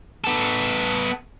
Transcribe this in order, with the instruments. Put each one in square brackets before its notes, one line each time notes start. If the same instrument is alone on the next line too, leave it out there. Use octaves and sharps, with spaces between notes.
[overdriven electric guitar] B3 A4